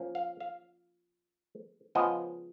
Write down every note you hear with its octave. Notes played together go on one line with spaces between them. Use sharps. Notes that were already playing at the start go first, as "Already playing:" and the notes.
Already playing: F3 A#3 C#4
F5
F5
C#3 F3 G#3 B3 D#5